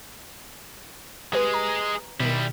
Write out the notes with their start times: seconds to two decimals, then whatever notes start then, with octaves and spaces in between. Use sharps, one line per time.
1.33 G#3 G4 G#4 B4
1.54 A#5
2.20 B2 D#3 G3 E4